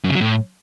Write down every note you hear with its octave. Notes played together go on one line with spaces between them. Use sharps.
F#2
C#3
F#3
A2